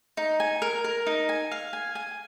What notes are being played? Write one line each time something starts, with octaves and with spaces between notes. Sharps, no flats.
D#4
G#5
A#4
A#4
D#4
G#5
F5
G#5
G#5